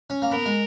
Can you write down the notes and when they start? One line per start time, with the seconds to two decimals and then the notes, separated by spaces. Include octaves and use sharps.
0.10 C#4
0.22 A#3
0.31 B3 A#4
0.46 G#3